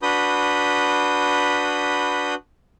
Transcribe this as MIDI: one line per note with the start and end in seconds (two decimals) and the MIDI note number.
0.02 2.34 62
0.02 2.34 66
0.02 2.34 71
0.02 2.34 83
0.02 2.34 87
0.02 2.34 91